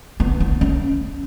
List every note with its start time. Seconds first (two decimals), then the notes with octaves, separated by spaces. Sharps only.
0.20 B3
0.40 B3
0.61 C#4